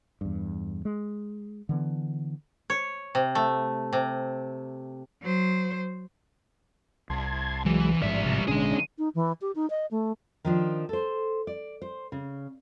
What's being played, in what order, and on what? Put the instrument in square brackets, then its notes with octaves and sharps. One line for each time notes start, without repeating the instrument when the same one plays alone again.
[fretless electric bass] E2 G2
G#3
D3 E3 B3
[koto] C#5
C3
A3
C3
[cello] F#3 C5
[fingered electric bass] C2 [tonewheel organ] A5 C6 G#6
[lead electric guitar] E3 [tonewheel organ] F#3 G#3
[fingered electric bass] A1 G#2 F3 [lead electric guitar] G3 E5 [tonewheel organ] D5
[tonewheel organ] C3 A6 A#6
[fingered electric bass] A1 B2 D3 [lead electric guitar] G#3 G#4 [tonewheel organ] C#4 D4
[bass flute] D#4
E3
G4
D#4
D#5
A3
[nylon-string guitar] D#3 F3 D4
A4 C5
D5
C5
C#3